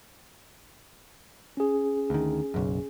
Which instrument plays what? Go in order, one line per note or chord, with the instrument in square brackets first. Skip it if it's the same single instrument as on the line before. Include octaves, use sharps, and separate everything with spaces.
[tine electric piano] C#4 G#4
[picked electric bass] D2 D#3
F#1 B1 F#2